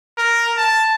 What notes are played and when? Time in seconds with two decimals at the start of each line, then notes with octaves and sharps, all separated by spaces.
0.18 A#4
0.57 A5